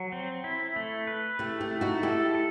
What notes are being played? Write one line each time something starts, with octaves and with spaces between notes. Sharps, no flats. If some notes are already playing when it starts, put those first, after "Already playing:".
Already playing: F#3 F#4
C4
E4
A3
B4
A3 E4 G4
E4 G4
A3
D#4 F#4
E4 G4 A4
A4